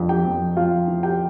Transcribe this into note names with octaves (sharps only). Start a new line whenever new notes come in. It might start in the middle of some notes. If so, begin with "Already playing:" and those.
Already playing: F2 D4 F4
G4 G5
F2
F2 F4 F5
E3
G4 G5